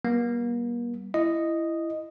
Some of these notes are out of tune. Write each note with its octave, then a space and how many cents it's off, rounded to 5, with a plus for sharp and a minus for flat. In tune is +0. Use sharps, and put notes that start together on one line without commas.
G3 -15 A#3 +40
E4 +15 D#5 -5